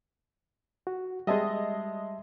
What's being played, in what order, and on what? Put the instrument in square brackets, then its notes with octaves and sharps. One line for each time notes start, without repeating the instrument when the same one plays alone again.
[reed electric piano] F#4
[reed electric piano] G3 E5 A5 [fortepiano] G#3 D#5